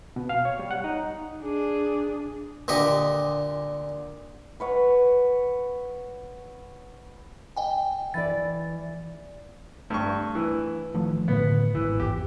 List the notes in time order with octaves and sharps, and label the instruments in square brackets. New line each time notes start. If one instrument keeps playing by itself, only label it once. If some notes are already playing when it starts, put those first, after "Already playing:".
[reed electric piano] B2
F5
C#5
G3
F#5
D#4
[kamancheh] D4 G#4
[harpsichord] A#2 D3 G4 D#5
[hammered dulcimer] B4 C#5 F#5
[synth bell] D#5 G5 G#5
[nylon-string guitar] E3 D5 [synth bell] A6
[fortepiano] G2 C#6 [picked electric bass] A3 D4
[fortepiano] E3
[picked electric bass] D#3 F3 A3
[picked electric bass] A2 D3 [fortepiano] B3
[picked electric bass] G#1 [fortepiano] E3
[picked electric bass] E2 [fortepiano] G4